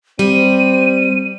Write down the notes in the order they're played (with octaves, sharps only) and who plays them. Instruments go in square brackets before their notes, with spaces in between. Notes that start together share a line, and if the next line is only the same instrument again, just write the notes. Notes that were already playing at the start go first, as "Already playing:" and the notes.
[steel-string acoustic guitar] G3 [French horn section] C4 [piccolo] D#7